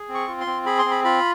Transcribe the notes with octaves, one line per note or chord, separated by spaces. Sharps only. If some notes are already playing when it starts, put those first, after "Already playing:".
Already playing: G#4
C4
C#6
F4
C6
C4
G#4 B5
C6
C4
B5
F4 B5